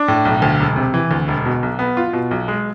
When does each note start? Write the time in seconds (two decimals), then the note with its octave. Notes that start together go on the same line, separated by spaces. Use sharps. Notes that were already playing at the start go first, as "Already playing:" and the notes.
Already playing: D4
0.08 A2
0.25 B1
0.42 D2
0.60 E1
0.76 C3
0.94 E3
1.11 D2
1.28 E1
1.45 B2
1.63 B1
1.79 B3
1.97 F4
2.13 B2
2.31 B1
2.48 G#3